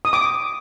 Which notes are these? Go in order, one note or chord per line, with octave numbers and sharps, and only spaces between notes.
D#6
D6